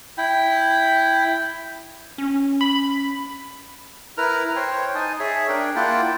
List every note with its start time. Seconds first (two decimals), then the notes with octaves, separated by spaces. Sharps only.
0.18 E4 G5
2.18 C#4
2.61 B5
4.18 E4 A#4 B4 A#5 F6
4.56 C5 C#5 G5
4.95 D#4 G#5 A5 D#6
5.20 G#4 C#5 E5
5.49 D4 A#4 G5
5.76 A#3 E4 F4 F#5 G5 A5